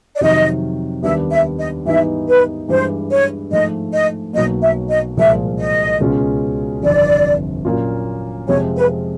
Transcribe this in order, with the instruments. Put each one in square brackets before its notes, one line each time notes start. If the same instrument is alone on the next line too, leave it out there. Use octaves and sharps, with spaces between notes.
[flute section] D5
[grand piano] F2 C3 D#3 F#3 [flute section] D#5
[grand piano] D#2 D#3 G3 B3 D4 [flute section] E5
[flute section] E5
D#5
[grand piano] G#2 E3 G3 B3 D#4 [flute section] E5
[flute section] B4
[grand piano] G2 E3 G#3 [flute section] C5
[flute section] C#5
[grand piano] G#2 F3 A3 [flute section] D#5
[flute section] D#5
[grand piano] B1 B2 F#3 A#3 [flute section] D#5
[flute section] E5
D#5
[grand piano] C2 A#2 F3 G#3 [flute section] E5
[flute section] D#5
[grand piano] C#2 B2 G#3 C#4 F4
[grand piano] G1 F2 C3 E3 [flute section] D5
[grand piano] A#2 F#3 A#3 C#4 F4
[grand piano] F2 C3 F3 G#3 C4 [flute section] C#5
[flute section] B4